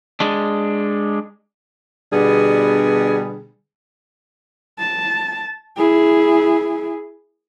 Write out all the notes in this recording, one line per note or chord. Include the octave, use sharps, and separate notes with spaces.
G#3 D4
B2 D3 G3 B3 D4 G#4
A5
E4 G#4